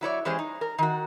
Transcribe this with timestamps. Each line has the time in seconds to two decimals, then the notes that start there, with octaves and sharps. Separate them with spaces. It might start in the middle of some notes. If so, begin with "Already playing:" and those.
0.01 F#3 E4 C#5 D5
0.25 E3 G#3 C#4 G4 G#4 C5
0.39 D#4
0.61 A#4
0.78 D#3 F#4